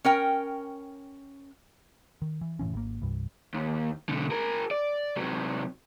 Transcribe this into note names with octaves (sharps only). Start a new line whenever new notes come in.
C#4 A#4 G5
D#3
E3
F#1 A2 E3 C#4
G#1 A#3
C2 G2
D#2
B1 D3
G#4 A#4
D5
C3 F#3